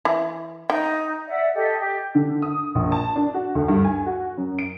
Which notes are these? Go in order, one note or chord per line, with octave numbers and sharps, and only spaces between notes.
E3
D#4 G5
D5 E5 F#5
G4 A4 D#5
G4
D3
D#6
A#1
A5
D4
F#4
D2
G2
G#5
F#4
F#2
D7